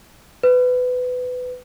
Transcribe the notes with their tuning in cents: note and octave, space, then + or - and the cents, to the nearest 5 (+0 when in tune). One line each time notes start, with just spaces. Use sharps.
B4 +20